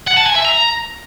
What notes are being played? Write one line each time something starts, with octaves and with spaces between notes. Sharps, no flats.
F#5
A5
G#5
E5
A#5